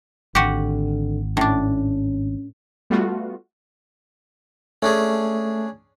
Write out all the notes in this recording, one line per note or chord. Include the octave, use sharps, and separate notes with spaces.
G#1 D3 F#4 G4
A2 C#4 D4
G3 A3 B3 F4 F#4
A3 C#4 D4 G#4